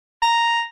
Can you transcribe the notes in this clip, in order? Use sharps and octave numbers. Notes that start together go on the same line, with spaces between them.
A#5